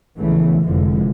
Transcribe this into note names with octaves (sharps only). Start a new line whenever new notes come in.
A#1 C#3 E3 A3 B3
F1 F2 D3 E3 F3 G#3